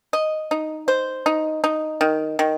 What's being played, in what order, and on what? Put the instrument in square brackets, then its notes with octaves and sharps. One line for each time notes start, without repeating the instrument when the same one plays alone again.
[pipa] D#5
D#4
C5
D#4
D#4
D#3
D#3